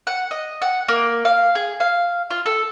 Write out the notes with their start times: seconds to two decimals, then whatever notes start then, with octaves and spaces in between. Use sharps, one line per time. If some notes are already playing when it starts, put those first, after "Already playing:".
0.07 F#5
0.31 D#5
0.62 F#5
0.88 A#3
1.25 F5
1.55 G#4
1.80 F5
2.31 F4
2.46 A4